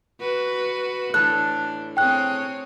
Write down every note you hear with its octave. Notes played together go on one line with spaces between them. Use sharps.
F#4 B4
A2 E3 D4 A4 F#6
C4 G#4 C#5 G5 F#6